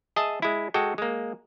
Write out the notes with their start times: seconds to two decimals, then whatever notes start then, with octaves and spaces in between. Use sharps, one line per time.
0.16 G#4 D#5 E5 A5
0.42 G#3 E4
0.74 G#3 F#4 A4 G5
0.98 G#3 A#3